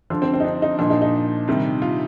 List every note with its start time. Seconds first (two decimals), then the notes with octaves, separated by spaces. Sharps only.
0.10 D3 F3 D4
0.22 C4
0.34 C4
0.40 D#4
0.45 D4
0.62 D#4
0.79 A#2 F3 D4
0.90 D#4
1.02 D#4
1.48 C3 D#3 G3
1.82 F4